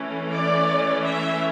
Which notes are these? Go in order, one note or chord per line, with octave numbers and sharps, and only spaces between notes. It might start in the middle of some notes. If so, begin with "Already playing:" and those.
Already playing: E3 A3 C#4
D5
E5